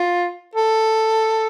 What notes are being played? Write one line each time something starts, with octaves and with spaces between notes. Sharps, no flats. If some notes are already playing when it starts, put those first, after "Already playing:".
Already playing: F4
A4